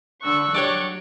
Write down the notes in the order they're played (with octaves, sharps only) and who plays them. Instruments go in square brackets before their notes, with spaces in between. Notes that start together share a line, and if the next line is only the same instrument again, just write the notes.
[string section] D3 E6 [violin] C#6 F#6
[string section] F#3 [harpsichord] D4 G4 C#5